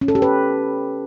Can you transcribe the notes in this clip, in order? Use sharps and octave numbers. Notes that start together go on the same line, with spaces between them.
C#4
A4
G4
B4